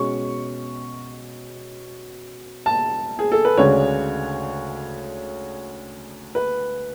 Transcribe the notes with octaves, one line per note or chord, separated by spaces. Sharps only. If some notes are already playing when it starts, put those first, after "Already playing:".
Already playing: B2 G#3 C#4 C#6
A5
G#4
A4
B4
D2 C#3 G#3 D4 C#5
B4